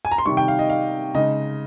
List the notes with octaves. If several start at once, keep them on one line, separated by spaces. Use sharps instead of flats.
G#5
A#5
C6
C3 D#3 G3 C#6
G5
F5
D#5
F5
C#3 G#3 D#4 D#5